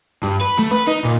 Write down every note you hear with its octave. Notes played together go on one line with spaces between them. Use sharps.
G2
B4
A3
B4
D#4
A#2